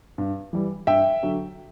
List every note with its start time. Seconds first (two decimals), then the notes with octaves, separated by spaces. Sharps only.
0.18 G2
0.53 E3 G3
0.87 G2 E5 G5
1.23 D3 F#3